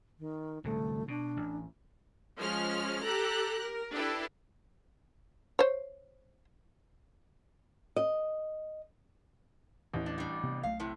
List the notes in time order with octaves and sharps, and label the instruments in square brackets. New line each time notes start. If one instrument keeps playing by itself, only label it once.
[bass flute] D#3
[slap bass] D1 C2 D3 [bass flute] A3
[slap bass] B2 [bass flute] D4
[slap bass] A1
[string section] F3 G#3 C#4 F6
G4 A4 A#5 F#6
A#4
D4 E4 G4 A4 B4
[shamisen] C5 C#5
[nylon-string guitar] D#5
[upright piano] A1 E3 [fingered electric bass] D#2 A2
[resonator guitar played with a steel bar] D4
G3 D4
[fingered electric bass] C3 B3
[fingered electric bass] B1 A3 [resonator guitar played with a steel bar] F5
[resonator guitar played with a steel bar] A2 C3